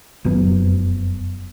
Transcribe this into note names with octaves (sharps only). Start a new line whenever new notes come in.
F1 F#2 F#3 B3